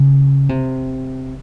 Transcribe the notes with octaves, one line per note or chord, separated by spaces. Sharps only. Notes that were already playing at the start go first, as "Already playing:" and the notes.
Already playing: C#3
C3